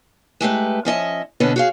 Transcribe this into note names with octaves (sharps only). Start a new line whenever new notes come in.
G#3 A3 G4 B4
F3 C#4 D#5 E5
B2 D3 B3 C#4 B4
F#4 G#4 F5